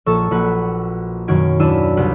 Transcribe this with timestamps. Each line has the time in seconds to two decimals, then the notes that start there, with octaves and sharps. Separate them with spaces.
0.06 A#1 A4 C#6 E6
0.31 A#1 F#4 B4
1.28 F#2 B2 D#3 F#4 G#6 D7
1.59 D#2 D4 E4 B4 E6 D#7
1.97 C2 G4 B4